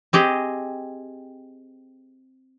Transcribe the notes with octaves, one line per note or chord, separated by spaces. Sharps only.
C4 G4 G#4 D#5